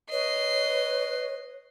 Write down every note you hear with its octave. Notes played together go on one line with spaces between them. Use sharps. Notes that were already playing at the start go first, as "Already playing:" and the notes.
B4 C#5 D#5 C7